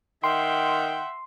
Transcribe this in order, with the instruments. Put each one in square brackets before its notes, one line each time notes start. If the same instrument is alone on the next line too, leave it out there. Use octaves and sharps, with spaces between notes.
[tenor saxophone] D#3 [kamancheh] E5 F#5 [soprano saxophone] G5 [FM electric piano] C6